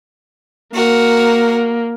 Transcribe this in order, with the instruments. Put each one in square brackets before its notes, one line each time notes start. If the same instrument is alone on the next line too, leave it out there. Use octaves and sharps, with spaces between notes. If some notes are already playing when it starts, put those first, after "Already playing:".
[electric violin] A#3 [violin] F#4 A#4